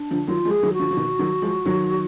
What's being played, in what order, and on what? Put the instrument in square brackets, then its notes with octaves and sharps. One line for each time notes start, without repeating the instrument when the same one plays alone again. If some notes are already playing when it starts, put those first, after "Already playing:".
Already playing: [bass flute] D4
[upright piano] D3 F3
[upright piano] D#3 F#3 [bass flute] F4
[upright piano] F3 G#3
[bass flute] G#4
[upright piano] D#3 F#3
[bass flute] F#4
[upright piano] D3 F3
F3
B2 D#3
D#3 F#3
F3 G#3
D#3 F#3